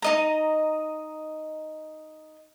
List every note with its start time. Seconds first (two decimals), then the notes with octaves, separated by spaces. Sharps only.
0.02 D#4 D#5 A#5